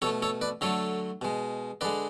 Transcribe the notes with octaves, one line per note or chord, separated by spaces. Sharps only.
B2 A3 A4 C#5
A4 C#5
B4 D5
D3 F#3 A3 A4 C#5
B2 G#3
D3 G#3 B4 D5